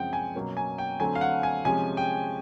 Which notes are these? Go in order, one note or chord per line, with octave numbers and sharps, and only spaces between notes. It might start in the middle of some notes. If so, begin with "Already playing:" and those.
Already playing: F#2 C#3 F3 G#3 C4 F#5 G5
G#5
B2 F#3 A#3 C#4
G#5
G5
D3 F#3 A3 C4 G#5
F5
F#5
G#5
C3 F3 G#3 C#4 G#5
G5